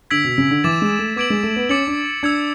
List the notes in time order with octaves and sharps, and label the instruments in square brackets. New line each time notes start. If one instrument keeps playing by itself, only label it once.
[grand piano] D3 [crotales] E6 G#6 B6 D7 F#7
[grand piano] B2
C#3
D3
[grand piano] E3 [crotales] D6 A6 E7
[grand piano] G#3
A3
[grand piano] B3 [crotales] D6 G#6 D7 F#7
[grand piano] G#3
A3
B3
[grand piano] C#4 [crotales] D6 A6 C#7 F#7
[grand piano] D4
[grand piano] D4 [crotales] E6 G#6 C#7